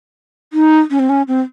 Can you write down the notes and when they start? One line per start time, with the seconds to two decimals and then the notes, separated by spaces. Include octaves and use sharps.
0.53 D#4
0.91 C#4
0.99 C4
1.09 C#4
1.28 C4